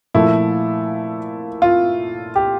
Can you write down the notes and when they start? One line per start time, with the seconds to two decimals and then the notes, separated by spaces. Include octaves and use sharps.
0.14 A#2 F3 A3 E4
1.62 F4
2.36 G4